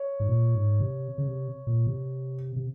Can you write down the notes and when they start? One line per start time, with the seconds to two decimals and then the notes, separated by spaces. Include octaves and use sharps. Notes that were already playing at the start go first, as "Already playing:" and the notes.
Already playing: C#5
0.20 G#2
0.28 A#2
0.55 G#2
0.80 C3
1.18 C#3
1.27 C3
1.67 A#2
1.87 C3
2.56 C3